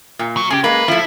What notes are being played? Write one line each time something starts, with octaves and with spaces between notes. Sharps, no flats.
A#2
F#3
C#3 G4 G#4
G#3 A#3 B4
F3 A3 E4